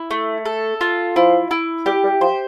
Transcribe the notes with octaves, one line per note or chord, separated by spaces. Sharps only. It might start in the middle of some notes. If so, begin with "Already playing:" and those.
Already playing: E4
A3
A4
F4
F3 E4
E4
G3 G4
G3
F3 C5